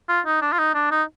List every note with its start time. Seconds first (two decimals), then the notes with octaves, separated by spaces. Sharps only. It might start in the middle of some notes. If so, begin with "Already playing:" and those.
0.09 F4
0.26 D#4
0.42 D4
0.53 F4
0.59 D#4
0.75 D4
0.92 D#4